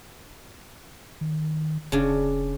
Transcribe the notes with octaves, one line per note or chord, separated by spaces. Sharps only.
D#3
E1 C#3 D4